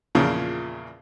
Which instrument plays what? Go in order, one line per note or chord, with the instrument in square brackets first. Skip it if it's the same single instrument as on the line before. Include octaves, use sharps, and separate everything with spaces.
[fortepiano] E2 A#2 C#3 F3